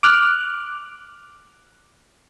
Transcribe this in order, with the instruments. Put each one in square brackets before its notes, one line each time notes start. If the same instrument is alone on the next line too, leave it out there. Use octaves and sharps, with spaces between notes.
[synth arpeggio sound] D6 F6 F#6